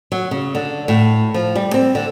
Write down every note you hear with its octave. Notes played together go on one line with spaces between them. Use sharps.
F#3
C#3
D3
A2
F3
G3
C4
D3